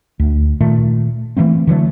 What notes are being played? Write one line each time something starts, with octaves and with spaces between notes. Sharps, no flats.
D2
A#2 D#3 A3
E3 A3 A#3 C4
D3 E3 F#3 A3